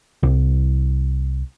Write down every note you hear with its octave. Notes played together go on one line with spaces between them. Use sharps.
C2